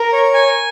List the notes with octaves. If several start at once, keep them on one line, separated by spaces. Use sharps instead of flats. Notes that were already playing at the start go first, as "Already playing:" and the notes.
Already playing: A#4
C#5
G#5